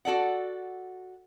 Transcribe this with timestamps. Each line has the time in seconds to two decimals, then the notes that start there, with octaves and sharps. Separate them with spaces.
0.05 F#4 A4 D5 F#5